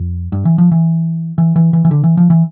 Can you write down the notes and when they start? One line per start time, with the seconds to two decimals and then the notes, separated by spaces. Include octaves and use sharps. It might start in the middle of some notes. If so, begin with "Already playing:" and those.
Already playing: F2
0.32 G2
0.45 E3
0.58 F3
0.72 E3
1.38 E3
1.56 E3
1.73 E3
1.85 E3
1.91 D3
2.04 E3
2.17 F3
2.30 E3